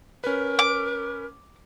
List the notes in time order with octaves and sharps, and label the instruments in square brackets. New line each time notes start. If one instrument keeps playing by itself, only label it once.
[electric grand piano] C#4 B4 [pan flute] A#4
[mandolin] D6